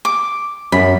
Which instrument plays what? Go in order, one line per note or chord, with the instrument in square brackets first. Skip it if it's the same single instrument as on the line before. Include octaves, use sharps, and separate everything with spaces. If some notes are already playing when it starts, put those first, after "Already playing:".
[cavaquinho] D6
[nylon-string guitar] F#2 [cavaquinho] B5